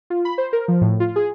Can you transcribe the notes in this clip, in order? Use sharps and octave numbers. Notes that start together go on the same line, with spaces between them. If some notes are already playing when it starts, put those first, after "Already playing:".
F4
B5
C5
A#4
F3
A2
F4
G#4